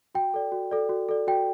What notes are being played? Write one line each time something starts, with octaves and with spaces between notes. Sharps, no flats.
F#4 G5
A4 D5
F#4
A4 D5
F#4
A4 D5
F#4 G5